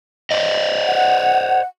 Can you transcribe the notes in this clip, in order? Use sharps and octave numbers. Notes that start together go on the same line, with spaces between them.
C5 D5 D#5
F#5